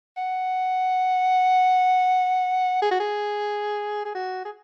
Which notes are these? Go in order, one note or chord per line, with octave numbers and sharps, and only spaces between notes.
F#5
G#4
F#4
G#4
G#4
F#4
G#4